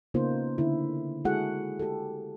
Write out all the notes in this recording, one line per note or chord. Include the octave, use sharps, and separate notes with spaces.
C#3 A#3 B3 D#4 F4 C5
D3 E4
G#3 E4 F#4 G#4 A4 F#5
G4 A4